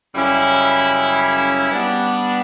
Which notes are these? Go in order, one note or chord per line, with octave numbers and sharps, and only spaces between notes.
F#2 C#3 G3 C#4 E4
G3 B3 D4